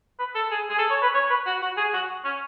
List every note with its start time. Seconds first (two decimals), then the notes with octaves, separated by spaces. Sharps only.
0.20 B4
0.35 A4
0.51 G#4
0.70 G#4
0.79 A4
0.91 C#5
1.03 B4
1.14 C#5
1.30 B4
1.46 F#4
1.62 F#4
1.77 G#4
1.93 F#4
2.25 C#4